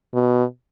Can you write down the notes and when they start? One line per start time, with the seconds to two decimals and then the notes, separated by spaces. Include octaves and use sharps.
0.14 B2